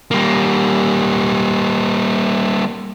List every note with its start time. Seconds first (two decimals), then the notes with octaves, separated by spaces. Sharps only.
0.11 G3 A#3